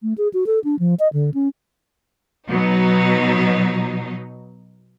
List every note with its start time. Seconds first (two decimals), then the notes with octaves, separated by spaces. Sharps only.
0.03 A3
0.18 G#4
0.34 F#4
0.46 A4
0.64 D4
0.79 F3
1.00 D#5
1.13 D3
1.34 C#4
2.49 B2 F#3 D#4